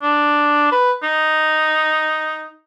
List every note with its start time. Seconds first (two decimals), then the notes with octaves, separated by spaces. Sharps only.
0.03 D4
0.72 B4
1.03 D#4